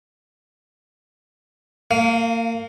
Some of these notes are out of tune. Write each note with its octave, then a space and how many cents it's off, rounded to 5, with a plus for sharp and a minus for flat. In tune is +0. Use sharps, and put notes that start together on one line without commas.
A#3 -30 F5 +0